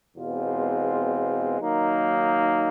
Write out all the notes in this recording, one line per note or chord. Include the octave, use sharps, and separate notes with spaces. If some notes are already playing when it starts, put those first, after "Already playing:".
E2 B2 G#3 C4 F4
D#3 F#3 A#3 D#4